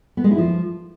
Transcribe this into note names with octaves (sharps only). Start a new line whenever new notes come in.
B3
G#3
E4
F3